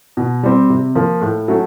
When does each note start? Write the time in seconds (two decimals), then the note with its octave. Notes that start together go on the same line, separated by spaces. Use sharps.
0.17 B2
0.43 G3 C4
0.70 C3
0.95 F3 A#3
1.21 A2
1.48 F#3 A3 C#4